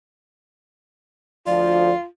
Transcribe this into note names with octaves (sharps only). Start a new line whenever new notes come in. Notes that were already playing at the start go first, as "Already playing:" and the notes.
D2 F3 F4 D5